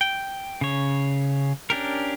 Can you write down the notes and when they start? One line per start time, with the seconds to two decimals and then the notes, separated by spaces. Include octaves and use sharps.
0.01 G5
0.61 C#3 C#5
1.70 C#4 D4 G4 A#4